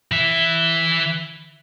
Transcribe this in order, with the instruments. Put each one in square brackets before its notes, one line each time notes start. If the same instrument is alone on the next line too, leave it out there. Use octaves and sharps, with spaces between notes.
[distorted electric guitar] E3 E5